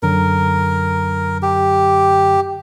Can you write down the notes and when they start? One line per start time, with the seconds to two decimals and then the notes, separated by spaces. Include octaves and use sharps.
0.03 F#2 D3 F#3 A#4
1.42 G4